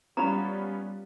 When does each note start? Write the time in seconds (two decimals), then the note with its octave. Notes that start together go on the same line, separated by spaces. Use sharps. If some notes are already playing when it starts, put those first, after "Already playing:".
0.17 G3 B3 C#4 F4 A#5 B5